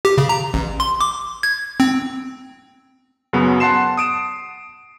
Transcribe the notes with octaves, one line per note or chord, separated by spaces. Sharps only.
G4
C#3
A#5
A1
C6
D6
G#6
C4
F#2 C#3 F#3 B3
F#5 A5 C6 C7 E7
D#6 D7 E7